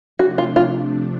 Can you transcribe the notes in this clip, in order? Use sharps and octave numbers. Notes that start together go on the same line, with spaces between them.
C3 F3 A3 D4 F#4
F4
F4